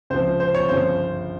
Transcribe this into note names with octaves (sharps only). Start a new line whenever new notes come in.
C#2 C3 F3 C5
C5
C#5
G1 F#2 C#3 F3 C5